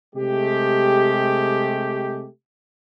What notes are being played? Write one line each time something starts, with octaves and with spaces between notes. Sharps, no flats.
C3 G#3 A3 G4